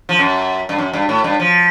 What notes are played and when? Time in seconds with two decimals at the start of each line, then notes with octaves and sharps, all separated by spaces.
0.09 F3
0.19 F#2
0.69 G2
0.78 F#2
0.93 G2
1.09 A2
1.24 G2
1.39 F3